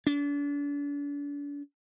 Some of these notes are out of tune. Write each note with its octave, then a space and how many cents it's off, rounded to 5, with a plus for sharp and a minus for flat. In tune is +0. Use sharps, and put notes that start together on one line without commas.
D4 -40